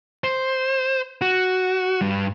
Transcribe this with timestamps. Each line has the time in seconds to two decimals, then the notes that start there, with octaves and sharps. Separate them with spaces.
0.24 C5
1.22 F#4
2.01 G2